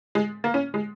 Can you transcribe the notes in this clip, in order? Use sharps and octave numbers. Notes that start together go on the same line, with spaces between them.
G#3
A#3
C#4
G#3